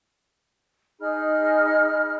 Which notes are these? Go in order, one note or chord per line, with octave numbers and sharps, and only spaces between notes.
D#4 G#4 B5 F6